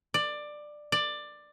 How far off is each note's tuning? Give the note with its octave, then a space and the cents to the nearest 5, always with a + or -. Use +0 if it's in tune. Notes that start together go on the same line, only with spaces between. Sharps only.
D5 +15
D5 +15